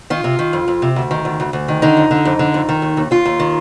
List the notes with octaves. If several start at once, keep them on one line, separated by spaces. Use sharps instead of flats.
D#3 F4
C3
D#3
F2
F2
C3
D2
D#3
D2
D2
D2
D#3
D3 D#4
F2
D3
F2
D3
F2
D#3
D#2
D#2
D#2 F4
D#2
D#3